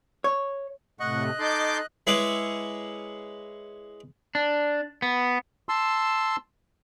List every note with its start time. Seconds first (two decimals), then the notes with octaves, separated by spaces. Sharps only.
0.24 C#5
1.00 A2 C3 A3 D#5 F#5 C#6 F#6
1.39 D#4 A4 C6 D6 G6
2.07 G#3 E4 G#4 B4 C#5 D6
4.35 D4
5.02 B3
5.69 A5 C6 E6